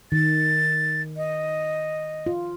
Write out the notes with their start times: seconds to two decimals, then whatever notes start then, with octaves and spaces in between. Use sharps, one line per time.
0.12 D#3 A6
1.17 D#5
2.26 F4